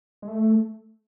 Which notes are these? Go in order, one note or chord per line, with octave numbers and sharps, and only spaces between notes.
G#3
A3